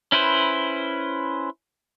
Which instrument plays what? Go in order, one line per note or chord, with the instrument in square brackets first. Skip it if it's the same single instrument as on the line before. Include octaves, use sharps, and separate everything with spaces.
[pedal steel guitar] C#4 E4 B4 C5